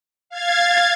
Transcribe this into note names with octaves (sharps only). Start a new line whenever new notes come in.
F5 G#6 A6